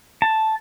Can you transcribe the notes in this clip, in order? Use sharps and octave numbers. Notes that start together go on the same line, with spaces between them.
A5